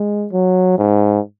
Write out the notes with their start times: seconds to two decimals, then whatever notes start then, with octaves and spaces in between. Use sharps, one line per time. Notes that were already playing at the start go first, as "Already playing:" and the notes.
Already playing: G#3
0.32 F#3
0.78 G#2